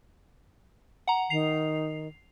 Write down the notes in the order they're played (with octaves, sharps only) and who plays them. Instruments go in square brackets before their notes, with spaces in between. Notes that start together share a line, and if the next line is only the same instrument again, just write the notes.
[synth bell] F#5 A#5
[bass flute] D#3 [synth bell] C7 F7